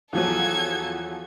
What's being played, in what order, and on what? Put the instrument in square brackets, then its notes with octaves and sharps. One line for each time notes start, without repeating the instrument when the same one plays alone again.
[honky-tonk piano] E2 F3 F#3 [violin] A4 G#6